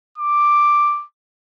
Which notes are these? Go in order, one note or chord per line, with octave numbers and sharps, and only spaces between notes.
D6